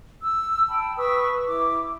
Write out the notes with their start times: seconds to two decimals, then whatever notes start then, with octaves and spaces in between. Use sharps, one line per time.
0.22 E6
0.69 G5 A5 B5
0.96 B4 C#6 D#6 E6
1.46 E4 D6